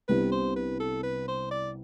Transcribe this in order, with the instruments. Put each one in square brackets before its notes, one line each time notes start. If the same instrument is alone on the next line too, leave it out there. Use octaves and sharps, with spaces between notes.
[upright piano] C2 C3 G3 B3 D4 [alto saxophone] B4
[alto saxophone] C5
B4
A4
B4
C5
D5